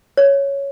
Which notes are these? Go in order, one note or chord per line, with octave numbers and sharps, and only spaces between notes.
C#5